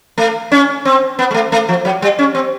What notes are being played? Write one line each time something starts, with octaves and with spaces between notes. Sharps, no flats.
A3
C#4
C4
B3
G#3
A3
A3
F3
F#3
G3
C#4
C4